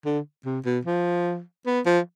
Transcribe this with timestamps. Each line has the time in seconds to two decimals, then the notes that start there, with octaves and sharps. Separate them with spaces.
0.05 D3
0.45 C3
0.65 B2
0.85 F3
1.66 B3
1.86 F3